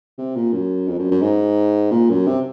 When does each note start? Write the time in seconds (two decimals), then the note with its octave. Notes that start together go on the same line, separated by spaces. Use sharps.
0.18 C3
0.36 A#2
0.53 F#2
0.88 F2
0.99 F#2
1.11 F#2
1.22 G#2
1.91 A#2
2.10 F#2
2.27 C3